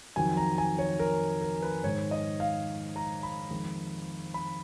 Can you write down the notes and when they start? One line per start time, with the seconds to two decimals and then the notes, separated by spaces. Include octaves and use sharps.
0.16 F2 D#3 F#3 G#5
0.37 A#5
0.58 G#5
0.79 C#5
1.00 A#4
1.42 A#4
1.62 B4
1.84 G#2 D#3 G#3 C#5
2.11 D#5
2.40 F5
2.96 A#5
3.23 B5
3.51 F2 D#3 G#3
4.34 B5